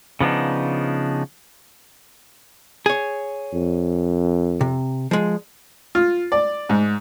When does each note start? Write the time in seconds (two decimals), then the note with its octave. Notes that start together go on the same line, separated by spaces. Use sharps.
0.20 C#3 F3 B3 D4 D#4
2.86 G#4 C#5
3.54 F2
4.61 C3
5.11 F3 G#3
5.95 F4
6.32 D5
6.69 G#2